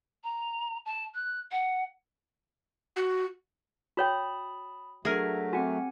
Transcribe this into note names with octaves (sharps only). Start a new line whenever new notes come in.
A#5
A5
F#6
F#5
F#4
F#4 C#5 G5 A5 B5 D#6
F#3 A3 D4 G#4 A#4 E5 A#6
C4 F#4 F#5 G#5